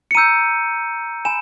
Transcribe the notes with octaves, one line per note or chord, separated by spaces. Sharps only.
C#7
A#5 E6 G6 D#7
G#5 B5 E7